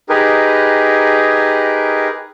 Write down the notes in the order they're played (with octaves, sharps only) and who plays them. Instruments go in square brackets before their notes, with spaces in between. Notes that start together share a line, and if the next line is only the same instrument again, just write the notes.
[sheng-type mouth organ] D#4 G4 G#4 A#4 B4